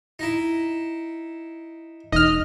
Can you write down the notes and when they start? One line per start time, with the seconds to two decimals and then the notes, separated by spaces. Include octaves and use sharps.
0.19 D#4 E4
2.12 E1 D#4 D#5 F6